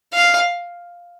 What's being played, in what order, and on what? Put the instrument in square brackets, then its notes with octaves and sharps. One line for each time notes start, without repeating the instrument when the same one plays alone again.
[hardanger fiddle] F5